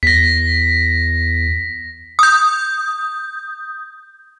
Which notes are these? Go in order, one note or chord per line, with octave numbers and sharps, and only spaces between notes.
E2 A#6 B6
D#6 G6